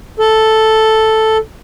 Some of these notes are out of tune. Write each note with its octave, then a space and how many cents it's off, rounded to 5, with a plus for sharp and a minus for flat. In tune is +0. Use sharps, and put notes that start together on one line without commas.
A4 +0